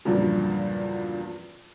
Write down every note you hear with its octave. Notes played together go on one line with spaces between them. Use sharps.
E2 G2 A#2 C#3 F3 F#3